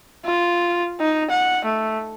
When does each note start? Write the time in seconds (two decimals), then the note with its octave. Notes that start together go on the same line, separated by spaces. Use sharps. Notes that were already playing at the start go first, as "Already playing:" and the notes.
0.25 F4
0.99 D#4
1.30 F#5
1.64 A3